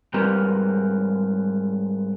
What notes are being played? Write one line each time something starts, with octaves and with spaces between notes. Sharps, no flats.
G#2 G3 C4 G4 A#4 B4